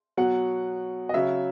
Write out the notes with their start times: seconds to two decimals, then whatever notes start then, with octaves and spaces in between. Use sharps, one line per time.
0.17 B2 F#3 F#5
1.09 D#5
1.14 C#3 F#3 E5